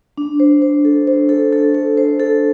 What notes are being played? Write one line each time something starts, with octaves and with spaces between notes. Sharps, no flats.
D4
C5
C5
A4
C5
A4
A4
A4
C5
A4